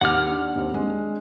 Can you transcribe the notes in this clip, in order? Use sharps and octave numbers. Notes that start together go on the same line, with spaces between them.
D#2 F#5 D6 F6
D4
D#2 C4
G#3 D4